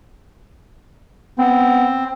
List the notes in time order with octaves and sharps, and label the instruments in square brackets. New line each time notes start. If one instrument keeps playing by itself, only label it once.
[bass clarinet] B3 [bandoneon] C4